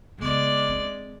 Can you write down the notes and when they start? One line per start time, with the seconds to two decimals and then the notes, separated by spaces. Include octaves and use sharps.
0.18 C#3 G#3 B3 D5
0.69 C4 D4